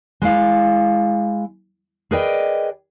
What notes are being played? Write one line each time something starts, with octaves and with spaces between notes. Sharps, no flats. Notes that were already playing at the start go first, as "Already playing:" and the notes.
G#3 E4 F5
G#4 A#4 B4 D5 D#5 G5